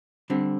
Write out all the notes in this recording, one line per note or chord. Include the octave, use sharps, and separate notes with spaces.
D3 G3 C4